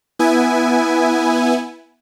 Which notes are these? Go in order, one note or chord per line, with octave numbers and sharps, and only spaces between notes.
B3 E4 G#5